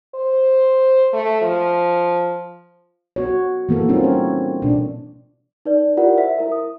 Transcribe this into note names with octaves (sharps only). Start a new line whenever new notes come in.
C5
A3
F3
B3 F#4 C#5
E3 A#3 B3 A4
G3 C4 C#4 D#4 F4
C#5
B2 D4
D#4 B4 D5
E4 F4 G4 A#4 D5 F#5
C5 E5 B6
E4 A#4 E5
D#6